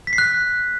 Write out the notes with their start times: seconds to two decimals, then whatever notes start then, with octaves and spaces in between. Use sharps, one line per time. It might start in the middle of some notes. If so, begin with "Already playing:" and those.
0.07 B6
0.13 C7
0.18 F#6